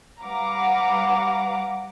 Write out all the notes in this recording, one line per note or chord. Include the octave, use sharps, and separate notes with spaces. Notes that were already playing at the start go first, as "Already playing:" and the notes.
G3 B4 F5 F#5 A#5 D6